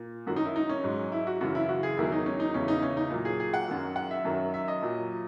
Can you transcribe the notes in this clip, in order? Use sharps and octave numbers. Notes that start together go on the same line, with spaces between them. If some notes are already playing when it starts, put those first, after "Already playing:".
Already playing: A#2
F#2 D#3 F#3 F#4
D#4
E4
D#4
C#4
G#2 F#3
E4
F#4
F#2 C#3 E3 F#4
E4
F#4
G#4
E2 D#3 F#3 E4
D#4
C#4
D#4
E2 C#3 E3 C#4
D#4
C#4
D#4
A#2 F#3
G#4
G#4
F#5
F#2 D#3 F#3
F#5
E5
F#2 D#3 F#3
E5
D#5
A#2 F#3